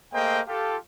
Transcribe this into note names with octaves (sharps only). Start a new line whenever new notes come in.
A3 A#3 G#4 C5 D#5 G5
F4 G4 A4